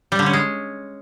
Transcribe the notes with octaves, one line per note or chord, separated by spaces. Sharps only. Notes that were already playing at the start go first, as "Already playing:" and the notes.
G3
D3
C#4
G#3